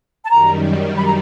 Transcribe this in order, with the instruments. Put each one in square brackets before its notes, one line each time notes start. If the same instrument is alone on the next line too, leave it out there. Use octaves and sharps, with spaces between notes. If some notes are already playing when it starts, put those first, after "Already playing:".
[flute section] A5
[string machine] F#2 D#3 G3 [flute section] A#5
[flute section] B5
A#5